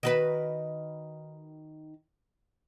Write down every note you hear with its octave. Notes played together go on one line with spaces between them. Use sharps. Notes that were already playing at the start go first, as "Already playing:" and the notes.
D#3 F#4 B4